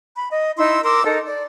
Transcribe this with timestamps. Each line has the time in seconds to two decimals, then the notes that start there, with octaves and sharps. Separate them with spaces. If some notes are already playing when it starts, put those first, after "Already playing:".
0.15 B5
0.30 D#5
0.58 D#4 E4 C6 E6
0.83 A#4 C6 D6 E6
1.04 D#4 A4 A#4
1.25 D5